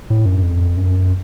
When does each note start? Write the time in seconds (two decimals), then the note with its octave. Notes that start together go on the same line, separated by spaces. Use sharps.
0.10 A2
0.26 F#2
0.43 F2
0.77 F#2